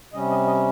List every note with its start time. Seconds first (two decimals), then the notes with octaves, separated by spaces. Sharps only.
0.13 C3 G3 C#4 D#5
0.30 D#5
0.47 D#5